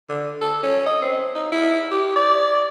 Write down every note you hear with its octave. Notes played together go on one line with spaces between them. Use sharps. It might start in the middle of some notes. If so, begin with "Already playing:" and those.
D3
A4
C#4
D#5
C4
D#4
E4
G4
D5